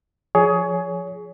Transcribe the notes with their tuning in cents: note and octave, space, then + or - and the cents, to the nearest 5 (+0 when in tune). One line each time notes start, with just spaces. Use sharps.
F3 +0 G#4 +15 C#5 +25